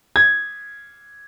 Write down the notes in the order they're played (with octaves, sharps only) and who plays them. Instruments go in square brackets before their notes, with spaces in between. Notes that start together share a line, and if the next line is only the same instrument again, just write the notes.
[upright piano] G#6